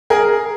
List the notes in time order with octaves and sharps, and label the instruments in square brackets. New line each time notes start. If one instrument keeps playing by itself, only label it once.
[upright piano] G#4 A#4